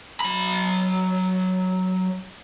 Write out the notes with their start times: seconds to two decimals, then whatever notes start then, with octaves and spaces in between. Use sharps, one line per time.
0.21 F#3 B5